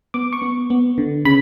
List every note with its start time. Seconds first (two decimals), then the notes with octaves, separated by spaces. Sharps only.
0.14 B3 D6
0.33 C#6
0.42 B3
0.70 B3
0.98 D3
1.25 C#3 B5